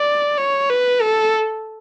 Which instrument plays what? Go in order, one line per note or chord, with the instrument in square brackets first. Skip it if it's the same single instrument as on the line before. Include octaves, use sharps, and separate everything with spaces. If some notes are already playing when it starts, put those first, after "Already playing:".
Already playing: [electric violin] D5
C#5
B4
A4